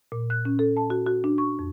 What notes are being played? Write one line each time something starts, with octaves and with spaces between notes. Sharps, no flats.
A#2
F#6
C#4
A4
A5
F#4
F#4
D4
C#6
F2